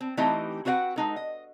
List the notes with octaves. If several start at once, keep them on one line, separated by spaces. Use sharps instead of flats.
C4
E3 A3 C4 D#4 G4 D#5
C4 F#4 B4 C#5 F#5 G5
G#3 D#4 A4
D#5